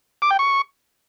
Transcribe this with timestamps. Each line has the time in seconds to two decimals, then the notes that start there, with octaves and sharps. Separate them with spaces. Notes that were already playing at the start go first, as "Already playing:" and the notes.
0.22 D6
0.31 G5
0.39 C#6